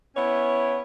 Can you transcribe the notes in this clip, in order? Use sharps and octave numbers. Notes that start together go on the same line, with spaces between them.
B3 C#4 E4 C#5